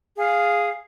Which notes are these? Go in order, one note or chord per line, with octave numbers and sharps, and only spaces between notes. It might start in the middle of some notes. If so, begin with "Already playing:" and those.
G#4 F5